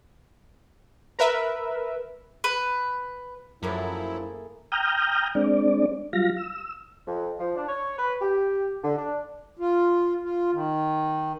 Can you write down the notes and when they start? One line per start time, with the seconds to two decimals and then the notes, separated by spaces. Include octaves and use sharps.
1.19 A#4 B4 E5
2.44 B4
3.63 F#2 F3 F#3 A3 A#3 E4 G#4
4.72 G5 A#5 D#6 F6 G6
5.35 G#3 C4 D4 D5
6.13 F#3 G3 F4 F5 A#6
6.37 E6
7.07 F2
7.39 F3
7.56 D4
7.67 C#5
7.97 B4
8.21 G4
8.83 D3
8.96 D4
9.59 F4
10.23 F4
10.53 D#3